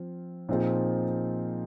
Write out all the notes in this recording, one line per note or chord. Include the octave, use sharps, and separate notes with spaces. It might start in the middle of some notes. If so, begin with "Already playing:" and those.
Already playing: F3 C4 F4
A#2 F3 C4 D#4 G#4